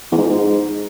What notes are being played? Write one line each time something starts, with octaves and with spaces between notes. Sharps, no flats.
E2
G#2
F2
G#2